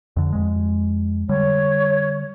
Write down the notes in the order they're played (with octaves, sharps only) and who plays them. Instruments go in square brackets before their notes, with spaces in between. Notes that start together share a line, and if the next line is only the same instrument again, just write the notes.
[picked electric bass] F2 D3
F2 G#3
[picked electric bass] D3 G3 [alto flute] C#5